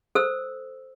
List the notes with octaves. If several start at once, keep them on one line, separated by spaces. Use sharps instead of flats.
A4 C5 E6